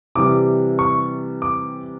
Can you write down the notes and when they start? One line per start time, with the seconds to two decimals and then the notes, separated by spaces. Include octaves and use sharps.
0.15 C3 E3 G3 D6
0.79 C#6
1.42 D6